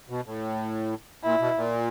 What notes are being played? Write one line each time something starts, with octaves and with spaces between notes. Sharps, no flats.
B2
A2
A#2 E4
B2
A#2